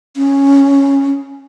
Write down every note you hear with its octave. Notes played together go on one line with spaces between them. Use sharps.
C#4